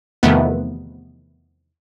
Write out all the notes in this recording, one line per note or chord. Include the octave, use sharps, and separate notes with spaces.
E2 C3 D#3 F3 A3 B3